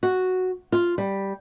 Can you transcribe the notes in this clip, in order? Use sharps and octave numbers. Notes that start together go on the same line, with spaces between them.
F#4
F4
G3